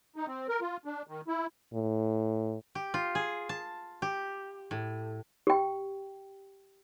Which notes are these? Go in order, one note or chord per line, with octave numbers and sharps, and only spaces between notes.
D#4
C4
A#4
F4
D4
D#3
E4
A2
G4
F4
G#4
A5
G4
A2
G4 G5